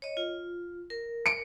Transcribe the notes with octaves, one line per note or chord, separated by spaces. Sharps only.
C#5 D#5
F4
A#4
C#7 D7